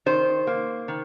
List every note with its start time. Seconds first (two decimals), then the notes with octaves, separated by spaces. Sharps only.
0.06 D#3 C5
0.47 A#3
0.88 D#3